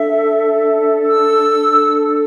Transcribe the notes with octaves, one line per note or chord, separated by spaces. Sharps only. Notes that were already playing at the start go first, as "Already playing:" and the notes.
Already playing: D4 A4 E5
E6